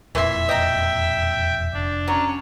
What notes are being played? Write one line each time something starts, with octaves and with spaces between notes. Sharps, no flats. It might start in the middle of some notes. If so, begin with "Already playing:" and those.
E1 F2 A#2 E3 E5 C6
D#5 G5 A#5
F1 D4
F#3 C#4 C#5